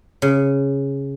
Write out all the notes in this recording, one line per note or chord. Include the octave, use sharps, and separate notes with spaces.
C#3